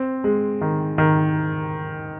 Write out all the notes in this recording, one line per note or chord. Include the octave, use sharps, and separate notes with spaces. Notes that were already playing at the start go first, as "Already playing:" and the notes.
Already playing: C4
G#3
D#3
D#3